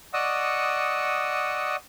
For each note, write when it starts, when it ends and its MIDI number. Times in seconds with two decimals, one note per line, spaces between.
0.14 1.76 74
0.14 1.76 75
0.14 1.76 78
0.14 1.76 85
0.14 1.76 87
0.14 1.76 88